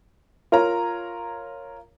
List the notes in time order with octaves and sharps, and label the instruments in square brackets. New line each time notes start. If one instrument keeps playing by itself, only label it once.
[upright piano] F4 A#4 C#5 A#5